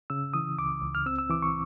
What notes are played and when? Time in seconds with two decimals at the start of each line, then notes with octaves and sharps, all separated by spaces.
0.10 C#3 E6
0.34 E3 D#6
0.59 C#2 D6
0.82 C#2
0.95 F6
1.06 C4 E6
1.19 E6
1.30 E3 D6
1.42 C#6